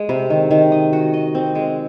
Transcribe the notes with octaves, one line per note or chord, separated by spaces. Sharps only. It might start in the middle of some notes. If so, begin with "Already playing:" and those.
Already playing: G#3
C3
D#3
D#3
D#5
F#4
D#5
C4
G#3